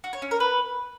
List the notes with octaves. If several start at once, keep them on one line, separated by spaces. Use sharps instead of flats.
F#4
C#5
C#4
A#4
B4